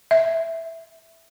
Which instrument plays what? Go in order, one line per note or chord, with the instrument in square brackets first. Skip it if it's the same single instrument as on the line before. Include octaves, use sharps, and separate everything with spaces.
[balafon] E5